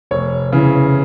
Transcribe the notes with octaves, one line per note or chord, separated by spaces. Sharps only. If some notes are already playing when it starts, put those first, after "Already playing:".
F1 C#5
C#3 E3